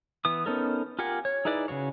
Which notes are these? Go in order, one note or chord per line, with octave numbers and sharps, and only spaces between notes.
E3 B3 D#6
B3 C#4 D#4 A4 A#4
F4 G4 A#4 F#5 G#5
C#5
D#4 E4 G#4 B4 D5
C#3 F3 F#4 C#5